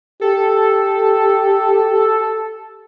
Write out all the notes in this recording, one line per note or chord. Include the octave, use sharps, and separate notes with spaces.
G4 A4